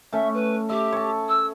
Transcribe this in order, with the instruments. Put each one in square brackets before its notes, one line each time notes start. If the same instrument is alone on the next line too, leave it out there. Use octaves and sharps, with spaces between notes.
[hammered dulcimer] A3 C#4 [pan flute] E5
[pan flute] B4
[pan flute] G4 [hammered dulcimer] E5
[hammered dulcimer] C#5 A5
[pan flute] E6